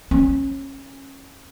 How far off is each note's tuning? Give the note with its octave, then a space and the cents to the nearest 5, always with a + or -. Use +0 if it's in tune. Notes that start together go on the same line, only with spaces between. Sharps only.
C#4 -25